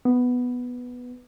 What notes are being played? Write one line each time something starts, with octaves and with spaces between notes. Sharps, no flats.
B3